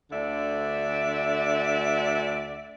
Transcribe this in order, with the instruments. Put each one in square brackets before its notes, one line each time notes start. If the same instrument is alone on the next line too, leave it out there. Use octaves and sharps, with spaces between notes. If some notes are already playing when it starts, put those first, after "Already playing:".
[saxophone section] D2 D3 D5 E5